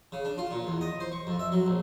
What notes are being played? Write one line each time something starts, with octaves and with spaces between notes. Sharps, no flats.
C#3
D4
F4
A#2
E2
D#5
C5
C#6
F2
E5
F#3
A#1